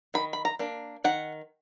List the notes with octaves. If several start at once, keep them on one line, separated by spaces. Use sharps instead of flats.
D#3 B5
B5
A#5
A#3 D4
D#3 F#5